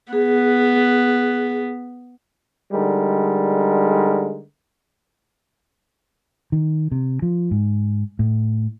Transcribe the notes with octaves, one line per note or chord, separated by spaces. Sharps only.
B3 G#4
D3 G3 G#3 D#4 A#4
D#3
C3
F3
G#2
A2